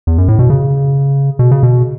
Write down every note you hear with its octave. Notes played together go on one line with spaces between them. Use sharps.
E2
F#2
A2
B2
C#3
B2
C#3
B2